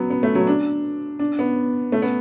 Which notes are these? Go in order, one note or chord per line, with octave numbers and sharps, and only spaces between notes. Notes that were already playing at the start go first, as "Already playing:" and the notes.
Already playing: F#3 B3
B3
A3
F#3
D4
D4
B3
A3
B3